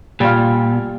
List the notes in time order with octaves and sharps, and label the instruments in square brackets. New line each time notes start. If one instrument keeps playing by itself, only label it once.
[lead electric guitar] A#2 [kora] G3 F4